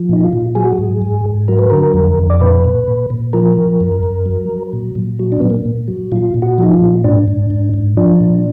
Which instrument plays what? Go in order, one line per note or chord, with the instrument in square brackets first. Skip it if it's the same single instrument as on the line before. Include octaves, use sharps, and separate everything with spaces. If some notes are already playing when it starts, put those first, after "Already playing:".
Already playing: [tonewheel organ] F3
A#2 D#4
F4
A#2
F#3 G#4
F#4
G#4
G#2
G#2
G#2
F#3 A#4
B4
D3 A#4
F2
F2
D5
A#2 B4
A#2
A#2
A#2
F3 A#4
F3
F#2
F#2
F#3
F#3
A#2
A#2
F#3
D4
A#2 B3
A#3
A#2
F#3
A#2 F4
A#2
F#4
F3 D#4
F4
A#2
G#2 D4
G#2
G#2
G#2
F3 D4
A#2